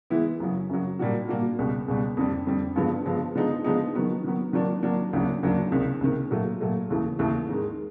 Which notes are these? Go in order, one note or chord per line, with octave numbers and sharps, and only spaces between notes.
E3 G#3 B3 E4
F#2 C#3 F#3
F#2 C#3 F#3
A#2 G3 A#3 D4 F#4
A#2 G3 A#3 D4 F#4
C#2 B2 G3
C#2 B2 G3
F2 D3 G3
F2 D3 G3
G2 D3 F3 G#3 B3
G2 D3 F3 G#3 B3
D3 F3 G#3 B3 D#4
D3 F3 G#3 B3 D#4
D#3 F#3 B3
D#3 F#3 B3
D#3 F#3 A#3 D4
D#3 F#3 A#3 D4
D2 C#3 F#3 A#3 D4
D2 C#3 F#3 A#3 D4
C#2 C3 D#3
C#2 C3 D#3
A#2 F#3 A3
A#2 F#3 A3
D#2 C#3 E3 A3
D#2 C#3 E3 A3
G#2 D#3 G#3